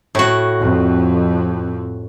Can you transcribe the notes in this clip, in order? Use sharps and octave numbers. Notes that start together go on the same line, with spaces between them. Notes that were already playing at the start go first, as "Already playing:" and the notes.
A2 F#4
F2